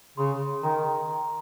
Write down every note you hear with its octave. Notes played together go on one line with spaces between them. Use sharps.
C#3 C6
D#3 A#5